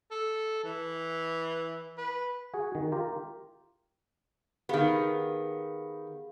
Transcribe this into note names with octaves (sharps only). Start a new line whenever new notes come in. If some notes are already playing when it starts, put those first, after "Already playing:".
A4
E3
B4
F#4 G#4 F#5
D#3
F4 G4 A#4
D#3 B3 G4 G#4 F5